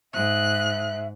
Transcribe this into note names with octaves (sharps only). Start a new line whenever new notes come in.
G#2 E5 F#6